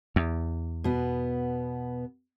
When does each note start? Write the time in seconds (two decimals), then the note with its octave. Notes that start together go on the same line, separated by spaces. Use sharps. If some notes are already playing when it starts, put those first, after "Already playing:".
0.16 E2
0.84 B2 B3